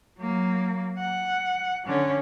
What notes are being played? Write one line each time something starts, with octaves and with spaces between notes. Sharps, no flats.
F#3 A#3
F#5
D3 C#4